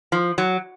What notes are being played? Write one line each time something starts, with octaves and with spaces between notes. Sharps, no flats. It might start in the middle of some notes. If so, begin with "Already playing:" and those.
F3
F#3